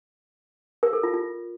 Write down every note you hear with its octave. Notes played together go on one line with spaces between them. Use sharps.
A#4
A4
F4
F4